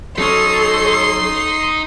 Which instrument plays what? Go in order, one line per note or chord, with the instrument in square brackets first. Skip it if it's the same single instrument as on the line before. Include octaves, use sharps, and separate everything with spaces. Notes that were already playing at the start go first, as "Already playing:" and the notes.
[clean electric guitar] F#3 C#4 [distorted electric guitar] D#4 [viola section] A4 C#5 [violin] C6